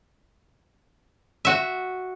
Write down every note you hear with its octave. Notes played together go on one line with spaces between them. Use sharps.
F#4 E5